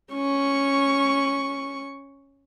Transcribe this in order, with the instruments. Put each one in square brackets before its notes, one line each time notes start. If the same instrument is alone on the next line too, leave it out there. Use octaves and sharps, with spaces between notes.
[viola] C#4 C#6